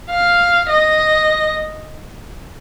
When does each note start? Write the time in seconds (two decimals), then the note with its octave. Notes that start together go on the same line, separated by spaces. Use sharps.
0.10 F5
0.70 D#5